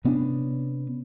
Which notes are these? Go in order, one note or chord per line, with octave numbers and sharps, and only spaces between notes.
C3 B3 C#4 D4